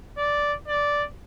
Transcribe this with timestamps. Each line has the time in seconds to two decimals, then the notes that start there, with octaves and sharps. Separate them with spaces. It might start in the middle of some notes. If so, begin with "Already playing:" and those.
0.17 D5
0.68 D5